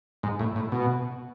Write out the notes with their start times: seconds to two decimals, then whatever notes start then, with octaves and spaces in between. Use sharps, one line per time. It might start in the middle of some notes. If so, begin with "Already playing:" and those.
0.23 G#2
0.40 A2
0.56 A2
0.72 B2